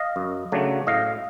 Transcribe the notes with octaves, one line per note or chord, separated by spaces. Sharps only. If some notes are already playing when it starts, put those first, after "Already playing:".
Already playing: D#5 F5
F#2
C#3 F#3 A3 D4
A2 D#5 F5